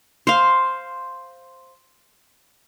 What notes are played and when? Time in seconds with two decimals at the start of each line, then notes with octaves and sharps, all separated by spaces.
0.27 C5 F5